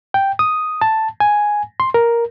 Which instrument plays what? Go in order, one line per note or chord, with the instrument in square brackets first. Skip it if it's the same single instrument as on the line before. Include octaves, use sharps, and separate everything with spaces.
[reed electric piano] G5
D#6
A5
G#5
C6
A#4